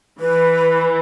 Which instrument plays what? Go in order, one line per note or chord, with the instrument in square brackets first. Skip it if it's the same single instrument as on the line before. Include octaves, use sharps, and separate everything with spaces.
[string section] E3 [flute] B4